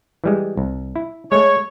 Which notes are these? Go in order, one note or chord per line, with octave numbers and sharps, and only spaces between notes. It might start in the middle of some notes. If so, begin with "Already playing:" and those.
E3 G3 G#3
C2
E4
G#3 A3 C#5